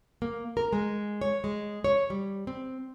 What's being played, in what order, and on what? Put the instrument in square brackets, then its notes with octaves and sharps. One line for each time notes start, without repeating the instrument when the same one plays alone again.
[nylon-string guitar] A#3
A#4
G#3
C#5
G#3
C#5
G3
C4